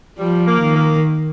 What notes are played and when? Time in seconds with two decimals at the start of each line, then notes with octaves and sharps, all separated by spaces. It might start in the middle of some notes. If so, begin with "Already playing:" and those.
0.18 F3 G3
0.47 A#3
0.61 D#3
0.75 A#3